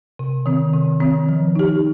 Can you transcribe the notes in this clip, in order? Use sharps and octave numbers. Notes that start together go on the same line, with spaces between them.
C3
D#3 C4
C3
D#3 C4
F3
D#4 G4